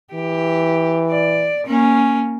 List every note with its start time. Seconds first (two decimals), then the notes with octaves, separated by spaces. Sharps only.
0.13 E3 G4
1.11 D5
1.66 A#3 C#4